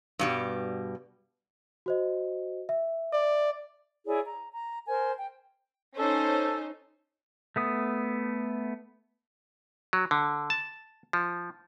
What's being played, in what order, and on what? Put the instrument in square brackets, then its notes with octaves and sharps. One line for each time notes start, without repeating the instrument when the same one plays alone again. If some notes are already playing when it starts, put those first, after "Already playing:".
[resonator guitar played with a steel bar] G2 B2 G3
[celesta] F#4 C5 D#5
E5
[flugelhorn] D5
[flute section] E4 G#4 C#5 D5
A#5
A#5
A#4 C5 G#5
G5
[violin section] C#4 C5 [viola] D#4 [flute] A4
[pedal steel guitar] A3 B3 D#6
[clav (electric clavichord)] F#3
D3
A5
F3